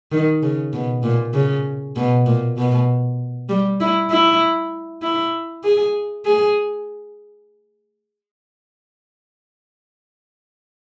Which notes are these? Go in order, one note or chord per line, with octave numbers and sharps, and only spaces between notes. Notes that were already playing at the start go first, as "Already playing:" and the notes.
D#3
C#3
B2
A#2
C#3
B2
A#2
B2
G3
E4
E4
E4
G#4
G#4